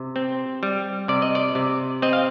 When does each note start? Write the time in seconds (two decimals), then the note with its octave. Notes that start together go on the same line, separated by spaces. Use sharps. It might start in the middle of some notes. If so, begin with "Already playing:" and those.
Already playing: C3
0.16 C4
0.63 G3
1.08 C3 D5
1.22 D#5
1.35 D5
1.55 C3
2.02 C4 D#5
2.13 F5